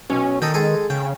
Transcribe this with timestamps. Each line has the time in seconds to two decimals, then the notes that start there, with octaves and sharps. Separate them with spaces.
0.10 B1 C#4
0.42 D#3 A4 D#5 G5
0.54 G#3 G#4 A4
0.90 C#3 G5